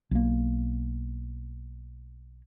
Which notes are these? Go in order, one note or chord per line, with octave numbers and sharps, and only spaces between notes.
B1 A#3